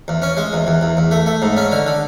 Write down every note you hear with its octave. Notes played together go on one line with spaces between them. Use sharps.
E2
C#4
G#3
E2
E2
E2
E2
A3
A3
G#2
C#4
D3
D3